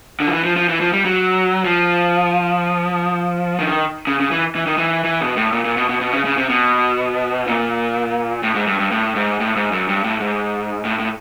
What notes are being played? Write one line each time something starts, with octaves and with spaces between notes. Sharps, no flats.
D3
F3
E3
F3
F3
E3
F3
G3
F#3
F3
D#3
C#3
C#3
E3
E3
D#3
E3
E3
B2
A2
A#2
A#2
B2
B2
B2
C#3
C#3
C3
B2
A#2
A2
G#2
G2
G2
A2
G#2
A2
G#2
F#2
G2
A2
G#2
A2
A2